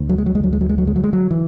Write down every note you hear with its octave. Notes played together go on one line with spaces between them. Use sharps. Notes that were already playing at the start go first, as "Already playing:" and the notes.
Already playing: D2
F#3
G#3
F#3
G#3
D2 F#3
G#3
F#3
G#3
F#3
D3 G#3
F#3
G#3
F#3
E3